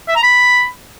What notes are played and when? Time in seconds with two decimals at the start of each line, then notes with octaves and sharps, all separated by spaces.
0.09 E5
0.16 A#5
0.23 B5